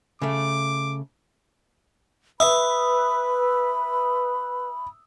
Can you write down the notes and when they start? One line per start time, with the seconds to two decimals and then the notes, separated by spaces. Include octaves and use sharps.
0.22 C#3 A3 D6
2.40 B4 E5 B5 D#6 E6